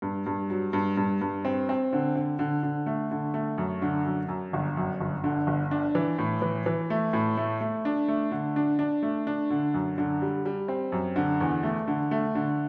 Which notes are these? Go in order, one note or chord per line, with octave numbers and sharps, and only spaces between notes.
G2
G2
F#3
G2
G2
G2
C4
C4
D3
D3
D3
D3
A3
D3
A3
F#2
D3
F#2
F#2
G1
F#2
G1
D3
G1
D4
E3
A2
E3
E3
A3
A2
A3
A3
D4
A3
D3
D4
D4
A3
D4
D3
F#2
D3
G3
G3
C4
F#2
D3
E2
A3
D3
A3
D3